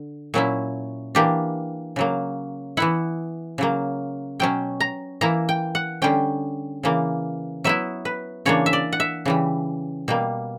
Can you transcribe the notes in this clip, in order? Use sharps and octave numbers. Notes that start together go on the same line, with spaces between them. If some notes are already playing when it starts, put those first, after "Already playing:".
Already playing: D3
A#2 F#3 C#4 E4
E3 A#3 D4 G4
C#3 F#3 A#3
E3 B3 E4 F#5
C#3 F#3 A#3
B2 F#3 C#4 G5
A#5
E3 A#3 E4 A#5
G5
F#5
D3 G3 C#4 G5
C#3 E3 A#3
F#3 B3 E4 E5
B4
C#3 E3 A#3 D4 C#5
E5
D5
F#5
E5
C#3 E3 G3
B2 G3 A#3